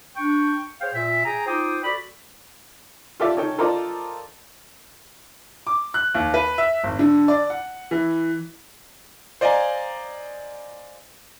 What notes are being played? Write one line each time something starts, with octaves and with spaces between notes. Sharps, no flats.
D4 G5 C#6
G#4 C5 C#5 F5 G5
A#2 E5
G#4 G5 G#5 A#5
D#4 F4 C5 G5 D6 D#6
F#4 A4 D5 B5
F4 G4 A4 D5 E5
C#4 D#4 A4 G5
F4 A4 A#4 C5 D5 D#5
D6
F#6
D#2
B4
E5
G#1
D3
D5
F#5
E3
C5 D5 D#5 F5 G#5 A#5